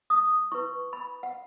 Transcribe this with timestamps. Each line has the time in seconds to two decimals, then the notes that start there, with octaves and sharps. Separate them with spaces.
0.10 D#6
0.52 E4 B4 C#6
0.93 B5
1.23 F#5